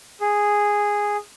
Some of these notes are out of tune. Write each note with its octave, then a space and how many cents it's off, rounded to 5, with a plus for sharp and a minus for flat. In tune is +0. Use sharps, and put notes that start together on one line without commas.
G#4 -5